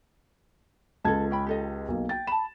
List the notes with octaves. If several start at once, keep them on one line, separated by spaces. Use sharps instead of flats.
C#2 F4 A4 A5 G#6
C#4 G5 B5
G4 A4 D#5
B1 A#3
G5 A6
A5 B5 E7